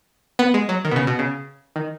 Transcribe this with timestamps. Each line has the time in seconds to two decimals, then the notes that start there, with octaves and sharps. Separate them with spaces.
0.39 B3
0.54 G#3
0.69 F#3
0.85 D#3
0.91 B2
0.96 C#3
1.07 B2
1.19 C#3
1.76 D#3